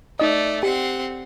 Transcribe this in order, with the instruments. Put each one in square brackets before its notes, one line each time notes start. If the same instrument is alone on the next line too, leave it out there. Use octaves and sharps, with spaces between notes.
[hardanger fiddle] A3 D5 [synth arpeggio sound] D#4 D#5
[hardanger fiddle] C4 F#5 [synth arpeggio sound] G4